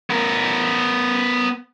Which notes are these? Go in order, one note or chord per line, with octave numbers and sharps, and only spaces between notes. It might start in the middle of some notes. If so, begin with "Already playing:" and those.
B3 A#4